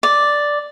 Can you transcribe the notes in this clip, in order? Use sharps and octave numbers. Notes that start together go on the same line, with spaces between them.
D5